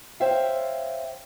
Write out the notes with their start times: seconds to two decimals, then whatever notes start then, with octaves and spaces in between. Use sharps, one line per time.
0.20 C5 C#5 E5 F5 G5